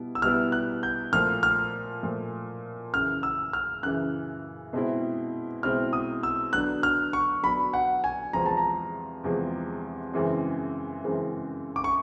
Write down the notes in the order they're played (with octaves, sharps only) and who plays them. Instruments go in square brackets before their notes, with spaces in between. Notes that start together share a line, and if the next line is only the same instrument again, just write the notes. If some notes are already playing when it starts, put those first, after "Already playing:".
Already playing: [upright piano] B2 G3 B3 E4
[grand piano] E6
[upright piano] B2 G3 B3 E4 [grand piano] F6
[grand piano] F#6
G6
[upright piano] A#2 F3 A3 [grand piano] F6
[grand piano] F6
[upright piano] A#2 F3 A3
[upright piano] F#2 C#3 E3 [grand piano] F6
[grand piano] E6
F6
[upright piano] F#2 C#3 E3 [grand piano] F#6
[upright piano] B2 G#3 C4 E4
[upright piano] B2 G#3 C4 E4 [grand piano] F6
[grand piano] D#6
E6
[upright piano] D3 F#3 B3 D4 [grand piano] F#6
[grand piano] F6
C#6
[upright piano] D3 F#3 B3 D4 [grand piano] B5
[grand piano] F#5
G#5
[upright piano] E2 C3 F3 G#3 C4 [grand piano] A#5
[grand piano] A5
A#5
[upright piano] E2 C3 F3 G#3 C4
F#2 C#3 E3 G#3 C4
F#2 C#3 E3 G#3 C4
[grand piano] D6
C#6